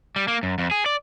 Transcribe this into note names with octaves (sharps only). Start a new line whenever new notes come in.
G3
A#3
F#2
F2
G#4
D5